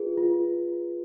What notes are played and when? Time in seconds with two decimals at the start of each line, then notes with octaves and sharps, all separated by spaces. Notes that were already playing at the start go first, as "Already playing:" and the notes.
Already playing: F4 G#4 B4
0.17 F4